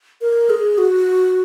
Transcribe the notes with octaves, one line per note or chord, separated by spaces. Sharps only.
A#4
G#4
F#4